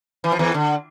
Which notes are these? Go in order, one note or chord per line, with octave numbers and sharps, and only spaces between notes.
E3
F3
E2 E3
D3